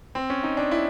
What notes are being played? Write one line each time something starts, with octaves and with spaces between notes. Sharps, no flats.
C4
C#4
D#4
D4
E4